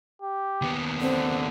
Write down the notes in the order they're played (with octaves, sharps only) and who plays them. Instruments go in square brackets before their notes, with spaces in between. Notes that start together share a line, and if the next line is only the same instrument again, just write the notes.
[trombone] G4
[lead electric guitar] D#2 B3
[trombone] D3 [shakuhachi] C4